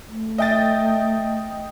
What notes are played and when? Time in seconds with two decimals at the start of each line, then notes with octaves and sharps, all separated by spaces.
0.08 A3
0.38 D#5 E5 G5 A6